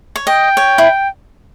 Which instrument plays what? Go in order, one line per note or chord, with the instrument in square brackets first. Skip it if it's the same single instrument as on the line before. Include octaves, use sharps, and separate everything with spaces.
[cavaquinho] C#5
[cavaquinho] D#5 [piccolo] G5
[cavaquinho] C#5
E4